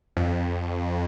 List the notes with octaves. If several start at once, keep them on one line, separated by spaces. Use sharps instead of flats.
F2